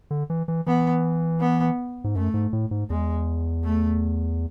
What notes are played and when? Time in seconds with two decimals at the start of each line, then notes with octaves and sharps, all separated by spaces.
0.11 D3
0.30 E3
0.48 E3
0.67 E3 B3
1.40 B3
2.04 G#2
2.15 F#2 A3
2.34 G#2
2.53 A2
2.71 G#2
2.90 E2 G#3
3.64 A3